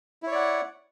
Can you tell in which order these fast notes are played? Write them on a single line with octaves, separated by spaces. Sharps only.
E4 C#5 D5 F#5